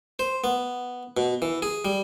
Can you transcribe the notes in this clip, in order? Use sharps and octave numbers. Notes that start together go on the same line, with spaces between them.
C5
B3
B2
E3
G#4
G3